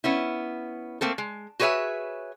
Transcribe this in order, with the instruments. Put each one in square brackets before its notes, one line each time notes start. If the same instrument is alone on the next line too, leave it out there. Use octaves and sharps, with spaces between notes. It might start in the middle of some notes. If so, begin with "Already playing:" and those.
[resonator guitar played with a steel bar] B3 C#4 E4
A3 A#3 C4 A4
G#3
F#4 G#4 B4 C#5 E5 G#5